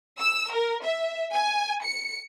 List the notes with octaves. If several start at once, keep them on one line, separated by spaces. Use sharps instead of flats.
E6
A#4
E5
G#5
C#7